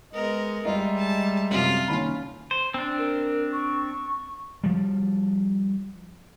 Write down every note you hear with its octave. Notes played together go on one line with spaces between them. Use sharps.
G#3 B3 A#4 D#5
G3 G#3 F4 D#5 E5 A#5
A5
F#2 C3 F4
D#2 C#4 B5
C5
C4 D4
A#4
C#6
F3 G3